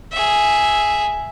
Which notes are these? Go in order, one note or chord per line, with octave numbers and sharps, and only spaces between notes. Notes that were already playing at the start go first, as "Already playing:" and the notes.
G#4 E5